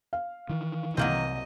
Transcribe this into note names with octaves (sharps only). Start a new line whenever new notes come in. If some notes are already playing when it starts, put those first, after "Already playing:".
F5
D#3 E3
C2 F#3 A#3 C4 D#5